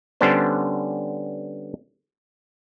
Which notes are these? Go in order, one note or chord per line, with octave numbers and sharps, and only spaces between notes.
D3 G3 B3 C#4 D4 C5